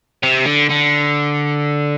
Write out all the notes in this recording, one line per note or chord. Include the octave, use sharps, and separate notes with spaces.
C3
D3
D3